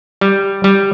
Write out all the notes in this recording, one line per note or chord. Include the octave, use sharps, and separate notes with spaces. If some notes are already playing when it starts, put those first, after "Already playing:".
G3
G3